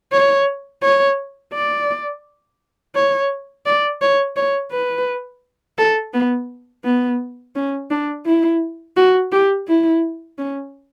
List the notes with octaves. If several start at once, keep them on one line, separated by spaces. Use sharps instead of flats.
C#5
C#5
D5
C#5
D5
C#5
C#5
B4
A4
B3
B3
C#4
D4
E4
F#4
G4
E4
C#4